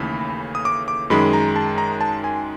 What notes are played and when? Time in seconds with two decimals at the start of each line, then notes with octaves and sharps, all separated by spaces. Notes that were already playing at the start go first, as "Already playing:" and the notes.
Already playing: D#2 C#3 E3 A3 B5
0.55 D#6
0.65 D6
0.88 D6
1.10 F#2 D#3 G#3 B5
1.33 A#5
1.56 A5
1.78 A#5
2.01 A5
2.24 G#5